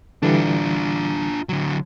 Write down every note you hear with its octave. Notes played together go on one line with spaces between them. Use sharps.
D3 E3 G3 D4 F4
D3 F#3